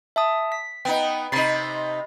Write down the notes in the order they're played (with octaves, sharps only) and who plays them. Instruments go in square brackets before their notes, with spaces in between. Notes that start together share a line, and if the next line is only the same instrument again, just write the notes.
[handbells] E5 A5 D#6
B6
[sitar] B3 D#4 [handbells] G5
[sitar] C3 D#4 [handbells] B5 A6 C7